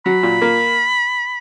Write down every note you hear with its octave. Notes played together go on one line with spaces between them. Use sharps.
F#3 B5
A#2
A#3